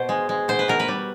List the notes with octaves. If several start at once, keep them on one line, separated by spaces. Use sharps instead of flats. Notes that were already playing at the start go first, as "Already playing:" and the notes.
Already playing: B2 C5
G#3
G#3
B2 C5
B4
B2 A#4
B4
G3